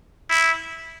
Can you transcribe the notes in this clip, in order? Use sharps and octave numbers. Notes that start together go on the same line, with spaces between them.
E4